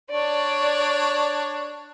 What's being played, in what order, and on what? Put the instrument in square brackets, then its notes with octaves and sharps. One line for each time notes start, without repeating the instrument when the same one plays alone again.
[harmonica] D4 C#5 [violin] D5